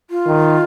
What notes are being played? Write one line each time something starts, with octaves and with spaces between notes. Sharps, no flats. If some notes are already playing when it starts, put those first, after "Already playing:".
F4
D#3